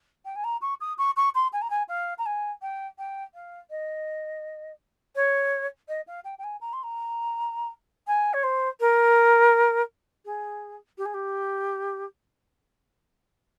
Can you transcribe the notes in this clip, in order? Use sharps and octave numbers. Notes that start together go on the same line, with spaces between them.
G5
G#5
A#5
C#6
D#6
C#6
C#6
C6
G#5
A#5
G#5
F5
A#5
G#5
G5
G5
F5
D#5
C#5
D#5
F5
G5
G5
G#5
A#5
C6
A#5
G#5
C#5
C5
A#4
G#4
G4
G#4
G4